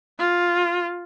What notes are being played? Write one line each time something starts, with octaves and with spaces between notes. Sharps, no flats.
F4